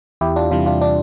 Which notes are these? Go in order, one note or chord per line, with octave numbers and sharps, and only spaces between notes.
E2 E4 G4
D4 F4
C3 E3 G3 D4 F4
D4 F4
D4